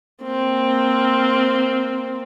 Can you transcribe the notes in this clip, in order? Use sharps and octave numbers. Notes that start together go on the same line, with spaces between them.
A#3 C4